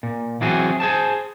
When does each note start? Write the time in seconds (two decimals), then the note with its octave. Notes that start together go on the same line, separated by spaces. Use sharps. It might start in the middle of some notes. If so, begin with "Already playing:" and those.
0.03 A#2
0.41 E3 F#3 C4 F#4 G#4
0.80 G#4 C5 A5